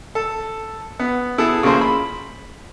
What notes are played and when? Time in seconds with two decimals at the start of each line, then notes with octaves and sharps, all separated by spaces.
0.15 A4
1.00 B3
1.38 B3 E4 G#4 A4
1.63 C#3 F3 A#3 G#4 C5
1.81 B5